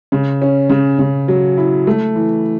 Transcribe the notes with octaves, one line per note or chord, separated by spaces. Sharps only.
C#3
C#4
C#3
C#3
F#3
E4
A3
E3